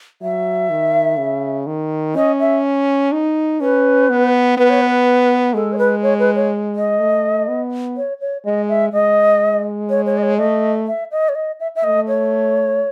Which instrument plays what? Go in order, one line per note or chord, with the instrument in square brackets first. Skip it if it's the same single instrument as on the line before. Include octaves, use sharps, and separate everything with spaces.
[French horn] F#3 [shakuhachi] E5
[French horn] D#3
C#3
D#3
[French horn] C#4 [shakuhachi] D#5
[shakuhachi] E5
[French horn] D#4
[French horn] C#4 [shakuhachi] B4
[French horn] B3
[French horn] B3 [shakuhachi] B4
[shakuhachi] C#5
B4
[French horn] G#3 [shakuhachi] A4
[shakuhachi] C#5
B4
C#5
B4
C#5
D#5
[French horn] A3
B3
[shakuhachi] C#5
C#5
[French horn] G#3 [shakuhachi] D#5
[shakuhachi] E5
[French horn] G#3 [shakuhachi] D#5
[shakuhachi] C#5
C#5
D#5
C#5
[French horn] A3 [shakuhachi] D#5
[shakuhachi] E5
D#5
C#5
D#5
E5
E5
[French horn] A3 [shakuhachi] D#5
[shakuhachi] C#5